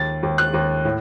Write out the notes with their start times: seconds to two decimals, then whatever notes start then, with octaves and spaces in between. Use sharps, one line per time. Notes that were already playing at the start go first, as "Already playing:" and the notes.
Already playing: D#2 A6
0.23 D#2
0.38 F#6
0.54 D#2
0.85 A2